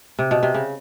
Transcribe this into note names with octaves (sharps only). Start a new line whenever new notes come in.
C3
B2
C3
C#3